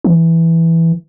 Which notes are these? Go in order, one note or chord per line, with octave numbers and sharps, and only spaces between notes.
E3